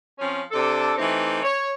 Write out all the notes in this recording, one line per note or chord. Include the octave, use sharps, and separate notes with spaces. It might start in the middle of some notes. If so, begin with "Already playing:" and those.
F3 C4 C#4
C3 D4 A4
E3 A3 C4 D#4 G4
C#5